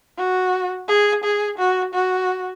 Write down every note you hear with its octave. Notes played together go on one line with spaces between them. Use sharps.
F#4
G#4
G#4
F#4
F#4